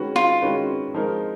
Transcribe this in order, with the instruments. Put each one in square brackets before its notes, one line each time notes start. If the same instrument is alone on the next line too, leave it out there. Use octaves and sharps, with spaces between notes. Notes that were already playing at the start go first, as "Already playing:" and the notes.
Already playing: [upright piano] D#3 G#3 C#4 F#4 B4
[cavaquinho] F4
[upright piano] D#3 G#3 C#4 F#4 B4
F3 G#3 D#4 A#4